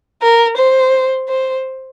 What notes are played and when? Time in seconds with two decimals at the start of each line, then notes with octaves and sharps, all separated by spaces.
0.22 A#4
0.58 C5
1.29 C5